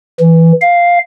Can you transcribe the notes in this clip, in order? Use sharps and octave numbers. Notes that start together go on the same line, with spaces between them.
E3
F5